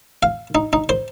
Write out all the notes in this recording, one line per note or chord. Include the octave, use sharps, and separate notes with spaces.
F5
D#4
D#4
C5